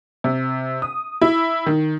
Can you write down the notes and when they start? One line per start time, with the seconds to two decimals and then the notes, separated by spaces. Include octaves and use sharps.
0.24 C3
0.82 D#6
1.22 E4
1.66 D#3